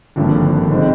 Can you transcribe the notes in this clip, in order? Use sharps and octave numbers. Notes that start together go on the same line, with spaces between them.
G#1 G2 D3 F3 A#3
G#1 D#3 G#3 C4